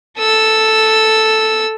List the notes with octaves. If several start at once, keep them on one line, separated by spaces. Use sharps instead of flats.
A4 E6